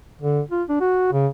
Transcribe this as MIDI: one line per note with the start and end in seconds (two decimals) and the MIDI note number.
0.22 0.41 50
0.51 0.63 65
0.69 0.78 62
0.81 1.09 66
1.12 1.27 49